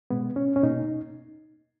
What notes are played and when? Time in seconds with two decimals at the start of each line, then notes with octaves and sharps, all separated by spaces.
0.10 B2 G#3 B3
0.36 C#4
0.56 C#4
0.63 B2 A#3 D#4